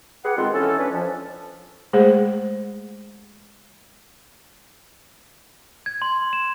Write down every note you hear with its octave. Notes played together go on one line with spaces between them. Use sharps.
G4 G#4 B4 F#5
B2 D#3 G3 G#3 C4 F4
E3 C#4 A4
C#4 D4 B4
F2 F3
G#3 A3 G#4 C5
G#6
C6
E7